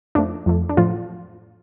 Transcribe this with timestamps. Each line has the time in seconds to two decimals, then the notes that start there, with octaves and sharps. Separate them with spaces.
0.15 F2 F3 A3 D4
0.46 F2 F3 A3
0.69 D4
0.77 A2 F3 F4